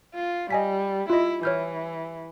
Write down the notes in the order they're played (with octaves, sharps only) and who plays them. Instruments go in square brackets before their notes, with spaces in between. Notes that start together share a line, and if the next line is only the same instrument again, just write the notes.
[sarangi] F4
[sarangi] G3 [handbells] D#5 G#5 B6
[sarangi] E4 [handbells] F4 D#5
[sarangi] E3 [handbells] C#5 F6 G6